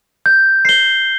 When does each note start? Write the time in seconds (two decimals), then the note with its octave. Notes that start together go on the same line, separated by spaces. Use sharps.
0.26 G6
0.65 C7 G7